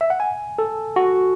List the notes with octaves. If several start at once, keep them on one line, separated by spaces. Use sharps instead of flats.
E5
F#5
G#5
A4
F#4